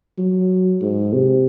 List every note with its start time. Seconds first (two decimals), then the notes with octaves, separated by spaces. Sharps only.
0.18 F#3
0.82 G#2
1.13 C3